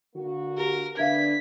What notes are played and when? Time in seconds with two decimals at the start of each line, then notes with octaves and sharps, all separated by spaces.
0.14 D3 A#3 F#4
0.57 G4 A#4
0.97 D3 B3 D4 A#4 E5 F5 G#6 B6